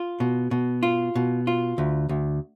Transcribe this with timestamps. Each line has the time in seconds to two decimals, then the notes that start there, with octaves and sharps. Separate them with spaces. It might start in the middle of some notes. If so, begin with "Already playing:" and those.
Already playing: F4
0.20 B2
0.51 B2
0.83 F4
1.15 B2
1.47 F4
1.78 D2
2.09 D2